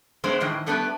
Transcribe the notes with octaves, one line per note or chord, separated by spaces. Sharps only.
G#3 A3 B3 D4 C5 D5
A2 D#3 E3 D4
G3 A3 B3 D4 G4 B4